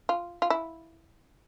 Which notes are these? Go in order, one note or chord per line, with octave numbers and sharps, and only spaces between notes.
F4
F4
E4